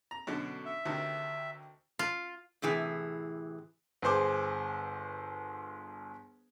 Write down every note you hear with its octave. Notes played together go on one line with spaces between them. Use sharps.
A#5
F#2 B2 D3
E5
D2 C3 D#3
F4
A2 C3 E3 G#4
G1 G#4 C5 D6